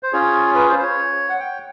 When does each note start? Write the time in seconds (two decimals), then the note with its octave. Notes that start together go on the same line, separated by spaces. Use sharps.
0.03 C5
0.13 C#4 F4 G#4 C#5
0.55 B4
0.69 C5
0.79 C5
0.83 C#5
1.29 F#5
1.39 G5